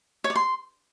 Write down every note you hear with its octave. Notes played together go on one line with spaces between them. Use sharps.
C#5
D5
C6